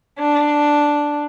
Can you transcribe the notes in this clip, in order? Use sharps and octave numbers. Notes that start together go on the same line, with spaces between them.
D4